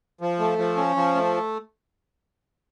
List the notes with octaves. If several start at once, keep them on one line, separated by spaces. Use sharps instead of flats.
F3
A3
F3
C#4
F3
A3